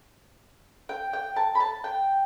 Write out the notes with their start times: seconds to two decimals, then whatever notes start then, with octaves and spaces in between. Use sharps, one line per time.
0.89 G5
1.13 G5
1.36 A5
1.55 B5
1.60 A5
1.84 G5